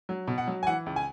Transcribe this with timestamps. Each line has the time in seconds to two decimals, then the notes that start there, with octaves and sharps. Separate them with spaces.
0.09 F#3
0.27 B2
0.38 F#5
0.47 F#3
0.63 G#5
0.67 E3 F#5
0.86 C#2
0.96 G#5